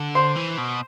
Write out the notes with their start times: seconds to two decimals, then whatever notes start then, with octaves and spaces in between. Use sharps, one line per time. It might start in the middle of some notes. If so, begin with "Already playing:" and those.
Already playing: D3
0.15 C5
0.36 E3
0.58 B2